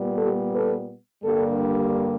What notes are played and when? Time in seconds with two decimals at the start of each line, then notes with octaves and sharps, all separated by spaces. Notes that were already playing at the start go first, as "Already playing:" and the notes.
Already playing: A#2 G3 B3
0.18 G4 A4
0.53 A4 B4
1.24 G2 D3 G3 A#3 G4 A4